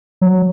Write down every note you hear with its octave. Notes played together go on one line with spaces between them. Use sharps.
F#3